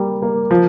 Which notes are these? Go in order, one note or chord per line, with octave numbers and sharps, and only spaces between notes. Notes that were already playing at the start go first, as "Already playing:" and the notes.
Already playing: G3 A#3
A#3
F3